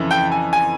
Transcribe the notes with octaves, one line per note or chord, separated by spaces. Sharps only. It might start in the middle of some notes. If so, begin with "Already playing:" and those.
Already playing: F2 C#3 E3
G5
G#5
G#5